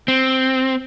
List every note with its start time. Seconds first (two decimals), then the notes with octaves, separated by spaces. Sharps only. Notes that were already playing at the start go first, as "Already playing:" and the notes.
0.08 C4